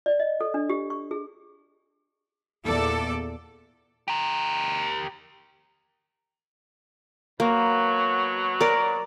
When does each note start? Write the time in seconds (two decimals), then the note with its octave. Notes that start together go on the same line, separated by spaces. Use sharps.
0.06 D5
0.20 D#5
0.41 A4
0.54 D4
0.69 G4
0.90 C#6
1.11 G#4
2.65 E2 A#2 A4 D5
4.08 G4 A#4
7.40 B2 F#3 A#3
8.61 A#4 D5